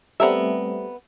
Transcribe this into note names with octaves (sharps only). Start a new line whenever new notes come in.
G3 A3 B3 C4 A#4 E5